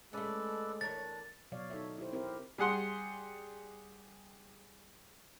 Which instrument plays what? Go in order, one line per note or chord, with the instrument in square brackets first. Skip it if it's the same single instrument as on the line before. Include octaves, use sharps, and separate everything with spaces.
[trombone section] G#3 [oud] A3 C#4 [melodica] A4 B4 D5
[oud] E2 A#4 C#5 [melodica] D4 [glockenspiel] A6
[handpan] B2 F#3 C#5 D5 F5
D#4 A4 C#5 E5
E4 G4 C5
C4 E4 G4 A#4 C5
[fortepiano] G3 G#4 F#5 C6